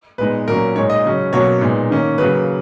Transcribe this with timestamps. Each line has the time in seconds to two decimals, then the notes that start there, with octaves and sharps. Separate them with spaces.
0.18 A#2 G#3 B3 D#4 B4
0.48 A#2 F#3 A#3 C#4 A#4
0.75 A#2 G#3 D#4 C#5
0.90 D#5
1.04 C#3 F#3 C#4
1.33 B2 F#3 A#3 C#4 C#5
1.61 A#2 G#3 B3 D#4
1.90 D#3 A#3 C#4
2.18 C#3 F#3 A#3 B4